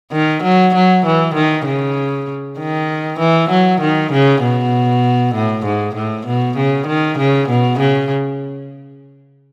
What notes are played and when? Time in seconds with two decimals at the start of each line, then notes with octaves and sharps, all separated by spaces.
0.12 D#3
0.43 F#3
0.74 F#3
1.05 E3
1.35 D#3
1.66 C#3
2.59 D#3
3.19 E3
3.50 F#3
3.80 D#3
4.12 C#3
4.42 B2
5.35 A2
5.65 G#2
5.95 A2
6.26 B2
6.57 C#3
6.87 D#3
7.18 C#3
7.49 B2
7.79 C#3